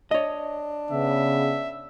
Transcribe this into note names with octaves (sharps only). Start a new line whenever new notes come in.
D4 C#5 D#5
C#3 B3 E5